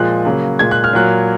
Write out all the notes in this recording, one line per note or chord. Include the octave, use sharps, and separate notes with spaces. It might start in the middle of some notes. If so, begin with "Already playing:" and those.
Already playing: A#2 F3 G#3 F#6
C#3 F#3 A#3
A#2 G#3 G#6
F#6
F6
A#2 F#3 A#3 F#6